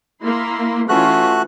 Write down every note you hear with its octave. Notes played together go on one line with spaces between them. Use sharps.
A#3 E4 C6
E3 A3 C#4 F4 F#4 F#6